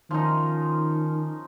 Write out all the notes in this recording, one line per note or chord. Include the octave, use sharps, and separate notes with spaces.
D#3 F3 C#4 D#4